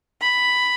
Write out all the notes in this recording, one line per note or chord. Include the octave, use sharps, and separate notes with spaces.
B5